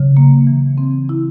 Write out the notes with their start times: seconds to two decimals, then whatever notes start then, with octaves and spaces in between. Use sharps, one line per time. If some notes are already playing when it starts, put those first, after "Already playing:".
Already playing: C#3 F#3
0.17 A#3
0.47 E3
0.78 C4
1.09 E4